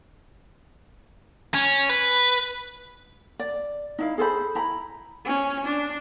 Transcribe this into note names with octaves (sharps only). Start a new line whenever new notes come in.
C#4
B4
D5
D#4 E4 F5
G#4 A4 C5 B5
E4 A#5 B5
C#4
D4